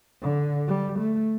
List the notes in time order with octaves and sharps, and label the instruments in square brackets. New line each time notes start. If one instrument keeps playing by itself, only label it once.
[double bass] D3
G3
A3